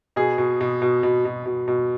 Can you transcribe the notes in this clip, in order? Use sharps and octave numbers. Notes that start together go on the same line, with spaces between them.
B2 G#4
B2
B2
B2
B2
B2
B2
B2